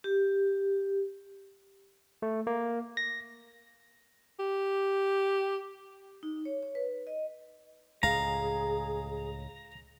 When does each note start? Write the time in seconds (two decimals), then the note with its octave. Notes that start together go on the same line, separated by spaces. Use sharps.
0.04 G4
2.22 A3
2.47 A#3
2.97 A#6
4.40 G4
6.23 D#4
6.45 C#5
6.63 C#5
6.75 B4
7.07 D#5
8.03 C#2 A2 G#4 F5 A#5